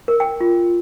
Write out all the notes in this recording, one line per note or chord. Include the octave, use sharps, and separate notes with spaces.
A#4
G5
F4